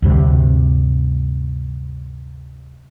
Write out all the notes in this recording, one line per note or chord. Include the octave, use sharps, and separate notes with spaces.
D2 G2 C3